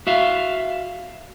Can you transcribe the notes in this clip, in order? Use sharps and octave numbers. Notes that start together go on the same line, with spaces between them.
F#4 E5 F5